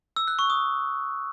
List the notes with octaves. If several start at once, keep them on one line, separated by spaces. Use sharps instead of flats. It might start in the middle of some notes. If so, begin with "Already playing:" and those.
E6
F#6
C#6
D#6